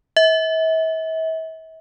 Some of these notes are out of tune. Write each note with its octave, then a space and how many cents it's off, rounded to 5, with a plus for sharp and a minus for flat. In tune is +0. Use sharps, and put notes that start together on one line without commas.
E5 -40